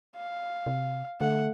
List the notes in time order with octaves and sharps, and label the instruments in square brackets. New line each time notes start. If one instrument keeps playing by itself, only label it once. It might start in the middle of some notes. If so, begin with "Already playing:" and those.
[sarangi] F5
[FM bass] C3
[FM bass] D3 [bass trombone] A3 [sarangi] F#5